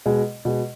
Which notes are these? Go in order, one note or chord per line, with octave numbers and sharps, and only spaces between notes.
B2 G#3
B2 G#3